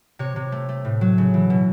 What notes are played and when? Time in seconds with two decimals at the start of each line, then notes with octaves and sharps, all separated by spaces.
0.19 C3 C#5
0.36 C3
0.52 A3
0.69 A3
0.85 A2
1.01 F#3
1.18 C#3
1.34 E3
1.50 B2